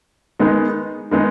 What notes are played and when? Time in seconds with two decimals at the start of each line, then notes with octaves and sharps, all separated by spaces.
0.39 D#3 G#3 B3 D#4
1.11 D#3 G#3 B3 D#4